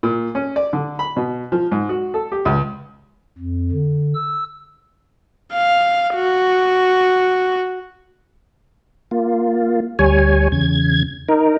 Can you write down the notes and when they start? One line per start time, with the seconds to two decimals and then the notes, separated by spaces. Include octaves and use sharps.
0.03 A#2
0.35 C#4
0.56 D5
0.73 D3
0.99 B5
1.16 B2
1.52 F3
1.72 G#2
1.89 F#4
2.14 A4
2.32 G4
2.45 C#2
3.38 F2
3.72 D3
4.15 E6
5.53 F5
6.15 F#4
9.11 A#3 F4
9.99 D2 G3 C#5 G#5
10.52 E2 C#3 G#6
11.29 D#4 A#4